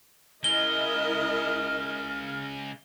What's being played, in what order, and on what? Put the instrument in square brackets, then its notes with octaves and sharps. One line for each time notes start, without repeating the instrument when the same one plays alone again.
[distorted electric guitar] C#3 G#3 [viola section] E4 A#4 D#5 [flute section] F6 [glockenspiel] G7